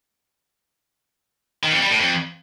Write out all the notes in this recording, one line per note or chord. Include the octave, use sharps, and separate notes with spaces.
D#3
F2
G3
A2
F2